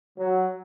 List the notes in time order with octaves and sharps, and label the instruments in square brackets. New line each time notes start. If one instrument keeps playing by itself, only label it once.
[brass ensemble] F#3